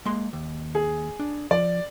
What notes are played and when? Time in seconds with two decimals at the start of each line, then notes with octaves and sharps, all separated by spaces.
0.06 G#3 A#3 C6
0.33 D#2
0.75 G#4
1.20 D4
1.51 F3 D5